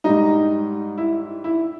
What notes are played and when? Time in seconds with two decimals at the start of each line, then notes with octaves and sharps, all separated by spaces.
0.04 G#2 G3 D#4
0.98 E4
1.44 E4